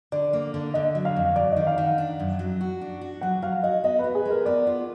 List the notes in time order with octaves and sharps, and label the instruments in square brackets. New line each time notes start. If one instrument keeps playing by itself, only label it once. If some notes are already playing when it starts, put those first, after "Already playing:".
[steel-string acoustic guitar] D3 [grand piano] D5
[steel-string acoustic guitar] A#3
D3
[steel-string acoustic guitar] D3 [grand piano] D#5
[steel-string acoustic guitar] F#3
[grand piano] F5
[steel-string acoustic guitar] F2
[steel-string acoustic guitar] F#2 [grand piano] D5
[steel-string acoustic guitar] D#3 [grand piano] D#5
[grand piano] F5
[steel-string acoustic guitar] D#3
[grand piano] F#5
[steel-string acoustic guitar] D4
F#2
F#3
F#4
D4
F#4
[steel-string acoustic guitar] F#3 [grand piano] F#5
[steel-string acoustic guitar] F#3 [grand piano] F5
[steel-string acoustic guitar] F#4 [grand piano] D#5
[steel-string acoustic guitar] B3 [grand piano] D#5
[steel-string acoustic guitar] B3 [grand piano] B4
[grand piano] G#4
[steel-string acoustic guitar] G#3
[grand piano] A#4
[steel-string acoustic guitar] B3 [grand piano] D5
[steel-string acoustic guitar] F4